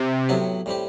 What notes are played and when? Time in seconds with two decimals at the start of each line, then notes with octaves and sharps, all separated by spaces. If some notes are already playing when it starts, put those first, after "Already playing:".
Already playing: C3
0.29 A2 F#3 B3 E4 G4
0.66 A2 G3 C4 G4